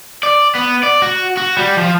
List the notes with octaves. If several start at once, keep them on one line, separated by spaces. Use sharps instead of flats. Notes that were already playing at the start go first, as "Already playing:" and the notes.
D5
B3
D5
F#4
F#4
G3
F3